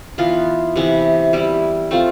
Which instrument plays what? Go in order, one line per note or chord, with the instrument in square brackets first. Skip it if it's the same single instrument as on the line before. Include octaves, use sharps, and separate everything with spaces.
[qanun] E3 B3 F4
C3 E3 B3
G3 B3 E4
A3 C4 F4